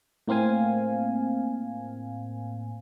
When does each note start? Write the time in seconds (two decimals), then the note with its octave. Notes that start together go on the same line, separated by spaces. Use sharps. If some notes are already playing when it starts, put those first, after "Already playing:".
0.28 A2 A#3 C4 F5 G#5